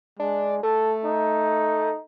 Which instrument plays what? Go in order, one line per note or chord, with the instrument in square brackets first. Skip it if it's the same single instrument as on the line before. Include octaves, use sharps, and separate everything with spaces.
[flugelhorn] G#3 [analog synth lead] D4
[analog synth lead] A3 [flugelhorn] A4
[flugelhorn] D#4